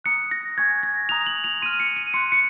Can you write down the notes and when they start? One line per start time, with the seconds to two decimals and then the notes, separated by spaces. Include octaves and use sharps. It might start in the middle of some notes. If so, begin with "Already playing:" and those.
0.04 A#5 D#6 F#6 C#7
0.31 A#6
0.57 G#5 C#6 F#6 G#6
0.83 A#6
1.09 A#5 D#6 F#6 F7
1.26 F#7
1.44 F7
1.62 C6 F6 D#7
1.80 C#7
1.97 D#7
2.14 C6 F#6 C#7
2.32 C#7